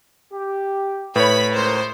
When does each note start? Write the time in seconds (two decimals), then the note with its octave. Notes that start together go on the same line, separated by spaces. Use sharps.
0.32 G4
1.16 A2 B4 C#5 B5
1.54 C#2 G#3 A#4 C5